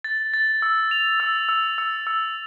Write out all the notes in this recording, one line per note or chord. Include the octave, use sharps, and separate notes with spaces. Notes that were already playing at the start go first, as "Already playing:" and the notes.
A6
A6
E6
F7
E6
E6
E6
E6